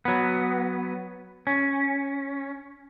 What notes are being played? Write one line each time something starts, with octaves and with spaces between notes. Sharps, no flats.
F#3 B3
C#4